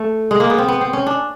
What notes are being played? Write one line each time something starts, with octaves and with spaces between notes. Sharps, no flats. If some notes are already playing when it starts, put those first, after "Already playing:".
Already playing: A3
G#3
A#3
B3
C4
B3
C4
C#4
D4